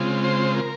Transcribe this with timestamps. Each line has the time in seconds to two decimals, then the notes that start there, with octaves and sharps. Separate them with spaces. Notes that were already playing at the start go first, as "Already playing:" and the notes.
Already playing: C#3 G#3 C4 F4
0.24 C5
0.55 A#4